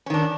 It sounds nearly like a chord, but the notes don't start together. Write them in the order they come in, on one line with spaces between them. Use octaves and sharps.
C#4 D#3 D4